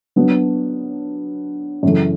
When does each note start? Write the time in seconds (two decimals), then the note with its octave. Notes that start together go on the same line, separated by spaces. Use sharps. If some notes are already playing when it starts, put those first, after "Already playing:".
0.16 F#3 B3 D4
1.83 F#2 C#3 E3 A3